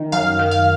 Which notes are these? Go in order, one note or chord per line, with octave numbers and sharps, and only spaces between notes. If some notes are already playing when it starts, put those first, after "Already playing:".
Already playing: D#3
F#2 F5
D#3
F5